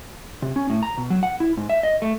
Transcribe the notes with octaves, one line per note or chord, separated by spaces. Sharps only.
C3
C#4
A2
A#5
B2
F#3
F#5
E4
G#2
E5
D#5
A3